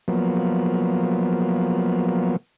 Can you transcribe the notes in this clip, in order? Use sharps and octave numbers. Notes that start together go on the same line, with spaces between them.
F3 F#3 A#3 B3